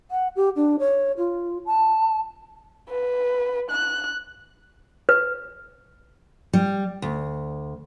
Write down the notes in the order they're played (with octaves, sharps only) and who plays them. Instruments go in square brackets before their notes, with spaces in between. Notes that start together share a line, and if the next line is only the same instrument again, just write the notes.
[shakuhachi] F#5
G4
D4
C#5
F4
A5
[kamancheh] B4
F#6
[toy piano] B4
[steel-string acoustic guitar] G3
D2